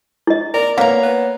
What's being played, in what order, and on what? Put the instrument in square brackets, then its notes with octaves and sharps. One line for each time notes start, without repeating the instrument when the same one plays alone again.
[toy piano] E4 D#5
[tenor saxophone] A#4 [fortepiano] D5
[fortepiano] A#3 [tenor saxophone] B3 [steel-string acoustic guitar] C#5 A#5 [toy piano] F5
[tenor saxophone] B3